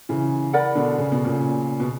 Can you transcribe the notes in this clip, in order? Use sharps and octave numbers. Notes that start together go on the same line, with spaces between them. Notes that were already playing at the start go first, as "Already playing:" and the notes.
C#3 E3
A#4 D5 F#5 B5
B2 D3
C#3
B2
A#2 C#3
B2